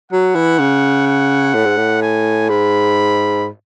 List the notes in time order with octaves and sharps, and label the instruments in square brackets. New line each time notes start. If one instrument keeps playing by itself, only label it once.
[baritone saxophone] F#3 [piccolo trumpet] F#5
[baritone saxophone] E3
C#3
[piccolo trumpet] F#5
[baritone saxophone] A2
G#2
A2
[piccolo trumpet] G#5
[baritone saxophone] G#2 [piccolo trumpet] B5